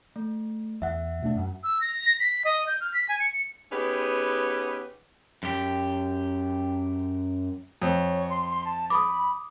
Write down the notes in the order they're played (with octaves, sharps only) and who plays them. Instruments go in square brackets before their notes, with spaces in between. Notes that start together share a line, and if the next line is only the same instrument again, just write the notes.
[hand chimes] A3
[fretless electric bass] E2 [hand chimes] E5 F#5
[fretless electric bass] B2 A3 D4
F#2
[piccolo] E6
A#6
B6
D#5
G6
F6
B6
G#5
C#7
[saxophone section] B3 C#4 D#4 G4 G#4 B4
[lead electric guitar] F#2 G4
[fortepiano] F2 [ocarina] C#5
[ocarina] C6
C6
A5
[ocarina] B5 [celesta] D6 D#6